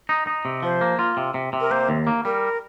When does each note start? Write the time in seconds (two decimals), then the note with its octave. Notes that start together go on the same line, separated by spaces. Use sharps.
0.09 D#4
0.27 D#4
0.45 C3
0.63 F3 C5
0.81 A#3
0.99 F4
1.17 C3
1.34 C3
1.53 C3
1.61 A#4
1.71 A#3 C5
1.89 D#2
2.07 A#3
2.25 G3 A#4